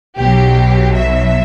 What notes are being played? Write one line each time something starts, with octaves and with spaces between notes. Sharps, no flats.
B1 B2 F#3 G4
E5